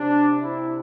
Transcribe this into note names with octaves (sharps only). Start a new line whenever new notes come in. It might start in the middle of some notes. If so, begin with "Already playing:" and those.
Already playing: C3 D4
C3 E4